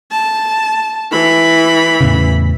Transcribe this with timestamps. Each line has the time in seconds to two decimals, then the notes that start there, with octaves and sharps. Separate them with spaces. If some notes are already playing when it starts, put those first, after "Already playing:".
0.11 A5
1.12 E3 B5
2.01 E2 A2 C#3